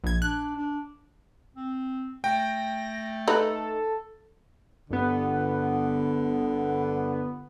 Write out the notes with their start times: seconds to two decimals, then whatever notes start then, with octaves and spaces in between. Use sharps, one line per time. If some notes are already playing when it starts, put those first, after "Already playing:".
0.04 A#1 G#6
0.22 D4 F#6
0.56 D4
1.56 C4
2.24 A3 G5 A#6
3.28 D#4 A4 B4
4.90 G1 D3 B3